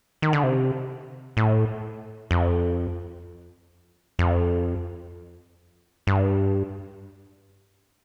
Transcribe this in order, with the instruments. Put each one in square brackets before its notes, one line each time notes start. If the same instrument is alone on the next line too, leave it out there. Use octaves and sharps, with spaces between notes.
[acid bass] D#3
D3
C3
A2
F2
F2
G2